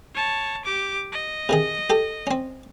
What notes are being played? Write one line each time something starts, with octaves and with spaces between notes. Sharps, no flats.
C#5 A5
G4 D6
D#5
C3 D#3 G#4
G4 A4
C4 C#4